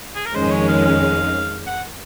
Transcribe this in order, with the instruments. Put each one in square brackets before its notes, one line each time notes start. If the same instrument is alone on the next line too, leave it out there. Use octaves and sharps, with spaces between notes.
[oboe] G#4
A#4
[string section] F2 D#3 G#3 C#4 [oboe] C5
[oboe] C#5
F5
F5
F#5